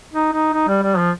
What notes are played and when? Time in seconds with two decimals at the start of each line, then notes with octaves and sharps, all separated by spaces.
0.14 D#4
0.33 D#4
0.53 D#4
0.68 G3
0.83 G3
0.97 F3